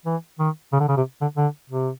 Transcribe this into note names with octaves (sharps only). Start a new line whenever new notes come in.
E3
D#3
C#3
D3
C#3
C3
D3
D3
C3